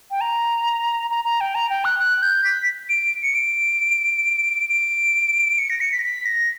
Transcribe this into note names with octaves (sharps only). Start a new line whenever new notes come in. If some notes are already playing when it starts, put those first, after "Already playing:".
G5
A#5
A#5
A#5
G5
A#5
G5
F#6
F#6
G6
B6
D7
C#7
D7
D7
C#7
A#6
C#7
B6
A#6
B6
A#6